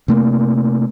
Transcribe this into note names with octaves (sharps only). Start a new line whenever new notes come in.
C3 A3 A#3